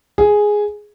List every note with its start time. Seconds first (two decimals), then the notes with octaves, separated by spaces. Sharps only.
0.18 G#4